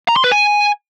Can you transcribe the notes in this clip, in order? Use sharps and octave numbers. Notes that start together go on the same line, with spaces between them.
A#5
C6
B4
G#5